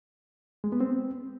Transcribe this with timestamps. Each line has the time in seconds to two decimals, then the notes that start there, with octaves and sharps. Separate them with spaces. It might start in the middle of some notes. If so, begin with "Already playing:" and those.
0.64 G#3
0.72 B3
0.80 C4